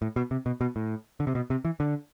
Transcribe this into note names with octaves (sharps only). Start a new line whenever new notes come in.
A2
B2
C3
B2
B2
A2
D3
C3
B2
C3
E3
D3